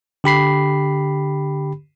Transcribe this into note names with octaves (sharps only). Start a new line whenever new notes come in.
D3 G4 B5 C7